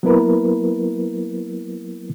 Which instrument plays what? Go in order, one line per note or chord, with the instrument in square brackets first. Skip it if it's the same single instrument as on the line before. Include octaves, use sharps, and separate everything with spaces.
[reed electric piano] F#3 A#3 B3 E4 A#4 B4